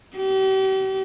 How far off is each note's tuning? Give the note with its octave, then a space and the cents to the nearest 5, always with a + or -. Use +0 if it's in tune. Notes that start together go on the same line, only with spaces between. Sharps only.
G4 -40